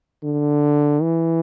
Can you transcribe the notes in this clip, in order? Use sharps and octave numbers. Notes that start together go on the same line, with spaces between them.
D3
E3